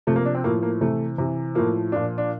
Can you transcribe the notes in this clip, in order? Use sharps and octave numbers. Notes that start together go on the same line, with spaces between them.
C3 F3 A3
A#3
D4
C4
A2 F3 A#3
A#3
C3 E3 A3
C3 E3
A2 F3 A#3
A#2 F3 D4
D4